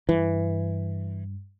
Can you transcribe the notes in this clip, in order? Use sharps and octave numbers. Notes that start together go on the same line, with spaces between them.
G2 E3